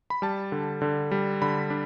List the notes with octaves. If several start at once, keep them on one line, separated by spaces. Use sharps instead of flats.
B5
G3 A5
D3
D3
G3
D3 B5
D4